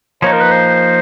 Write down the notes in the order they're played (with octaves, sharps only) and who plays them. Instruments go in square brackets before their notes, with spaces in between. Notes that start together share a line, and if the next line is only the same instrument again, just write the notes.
[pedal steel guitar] F3 A#3 D#4 [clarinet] C#5
[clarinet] A#4
B4
C5